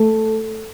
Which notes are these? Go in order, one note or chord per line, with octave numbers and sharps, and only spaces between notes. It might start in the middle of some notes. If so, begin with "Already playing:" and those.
Already playing: A3